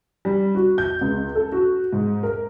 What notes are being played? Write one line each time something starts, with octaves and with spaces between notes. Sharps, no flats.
G3
F#4
G6
C#2
A4
F#4
G#2
A#4